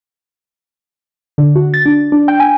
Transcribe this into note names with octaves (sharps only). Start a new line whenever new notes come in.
D3
F#4
A6
D4
D4
G5
G#5